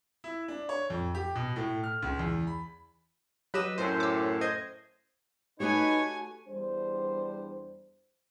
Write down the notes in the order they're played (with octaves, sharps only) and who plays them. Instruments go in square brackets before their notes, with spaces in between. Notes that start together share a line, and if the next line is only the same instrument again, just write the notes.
[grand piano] E4
D4
C#5
F2
G4
B2
A2
F6
C#2
E2
B5
[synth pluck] F#3 G4 [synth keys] B4 D#5 E6
[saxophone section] F#2 A2 [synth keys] C5
[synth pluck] D6 E6
[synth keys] C5 D#5 G#6
[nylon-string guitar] A3 F#4 G4 [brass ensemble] D#4 B4 [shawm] C#5 [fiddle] G#5
[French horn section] E2 G3 D4 C5